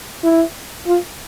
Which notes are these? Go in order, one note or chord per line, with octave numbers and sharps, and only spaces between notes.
E4
F4